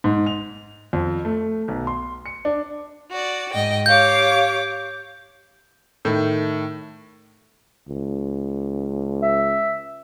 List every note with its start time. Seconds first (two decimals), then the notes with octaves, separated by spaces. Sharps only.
0.04 G#2
0.26 F7
0.93 F2
1.25 A3
1.68 B1
1.87 C6
2.26 C#7
2.45 D4
3.11 F#4 D5
3.52 G#2 D#5 G5
3.86 G4 C#5 F5 D6 G6
6.05 A2 D#3
7.88 C#2
9.22 E5